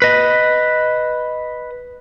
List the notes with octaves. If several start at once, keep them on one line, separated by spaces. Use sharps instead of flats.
B4 D#5